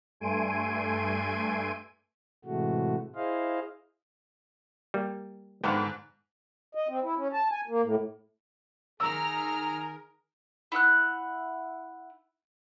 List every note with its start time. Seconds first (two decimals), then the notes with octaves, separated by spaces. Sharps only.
0.20 G2 A3 G#5 C6 D7 D#7
2.45 A2 C3 E3 G#3 A3 F#4
3.15 E4 G#4 C5 D#5 F5
4.94 G3 A#3
5.64 G#2 D3 F3 B3 A4 G5
6.75 D#5
6.89 C4
7.03 E4
7.17 C#4
7.33 A5
7.51 G#5
7.68 A#3
7.83 A2
9.00 D#3 G#4 A#4 A#5 E6 F6
10.72 E4 F#5 E6 F#6